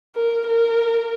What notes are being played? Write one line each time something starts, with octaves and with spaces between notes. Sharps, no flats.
A#4
A#4